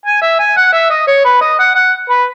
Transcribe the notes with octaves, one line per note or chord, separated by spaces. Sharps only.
G#5
E5
G#5
F#5
E5
D#5
C#5
B4
D#5
F#5
F#5
B4